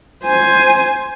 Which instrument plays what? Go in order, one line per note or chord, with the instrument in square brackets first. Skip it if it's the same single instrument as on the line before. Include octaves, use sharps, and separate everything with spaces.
[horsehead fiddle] C5 G#5